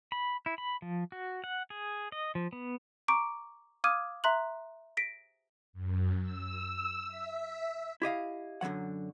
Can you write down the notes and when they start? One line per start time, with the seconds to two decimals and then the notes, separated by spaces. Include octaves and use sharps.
0.12 B5
0.46 E4
0.58 B5
0.82 F3
1.12 F#4
1.44 F#5
1.70 G#4
2.12 D#5
2.35 F3
2.53 B3
3.08 A#5 C#6 D6 D7
3.84 F5 D6 D#6 F6 G#6 D#7
4.24 E5 A#5 C6 F#6 F#7
4.97 A#6 B6 D7
5.73 F#2
6.22 E6
7.07 E5
8.02 E4 G4 D#5 F5
8.61 F#2 D3 E3 F#3 F#5